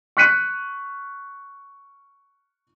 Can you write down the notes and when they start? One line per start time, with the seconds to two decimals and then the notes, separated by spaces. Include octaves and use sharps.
0.17 C#6 F6 F#6 B6 C#7 D#7